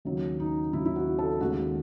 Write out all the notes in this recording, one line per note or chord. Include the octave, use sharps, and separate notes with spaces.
D#2 C#3 F#3
D#4
D#2 C#3 F#3 E4
E4
F#4
A4
D#2 C#3 G#3 F#4